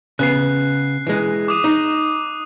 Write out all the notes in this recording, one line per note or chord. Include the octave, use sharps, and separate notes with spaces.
C#3 B3 F#6 C7
E3 G#3
D6 D#6 D#7
D#4